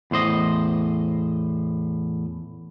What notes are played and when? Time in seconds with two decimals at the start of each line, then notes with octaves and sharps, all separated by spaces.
0.11 E2 A2 C5 D#5